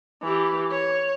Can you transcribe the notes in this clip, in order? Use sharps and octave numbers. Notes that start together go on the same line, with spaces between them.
E3 G4
C#5